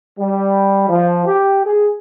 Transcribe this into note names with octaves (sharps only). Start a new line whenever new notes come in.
G3
F3
G4
G#4